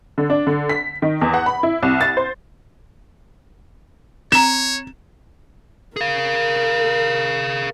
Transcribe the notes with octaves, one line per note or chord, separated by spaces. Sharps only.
D3
D4
D3
B6
D#3
E2
F#5
B5
E4
C2
A6
C5
C4 C#5 A#5 E7
G#4 A#4 F5